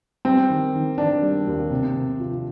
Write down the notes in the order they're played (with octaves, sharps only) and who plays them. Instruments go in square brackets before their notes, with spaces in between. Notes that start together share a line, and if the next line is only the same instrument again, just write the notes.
[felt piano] G3 [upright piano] C4
[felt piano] D#3
D#3
[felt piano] D#3 [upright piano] D4
[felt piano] G3
D#2
C3
C3
F3